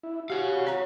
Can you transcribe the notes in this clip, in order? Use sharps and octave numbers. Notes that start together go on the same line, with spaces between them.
E4
F#4 G4 C#5 F5
C#5 A#5